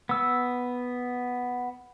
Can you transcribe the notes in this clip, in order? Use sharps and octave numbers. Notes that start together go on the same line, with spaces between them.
B3 E6